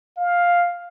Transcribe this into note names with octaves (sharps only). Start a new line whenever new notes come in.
F5